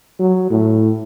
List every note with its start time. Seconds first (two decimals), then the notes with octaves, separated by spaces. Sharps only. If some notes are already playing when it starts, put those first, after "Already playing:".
0.19 F#3
0.50 A2